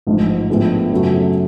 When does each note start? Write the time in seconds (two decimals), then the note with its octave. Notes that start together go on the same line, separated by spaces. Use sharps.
0.07 A1 G#2 F3
0.49 A2 F3 G#3 B3 D4
0.91 F#2 C#3 F#3 A3